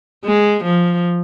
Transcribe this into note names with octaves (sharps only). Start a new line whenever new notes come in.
G#3
F3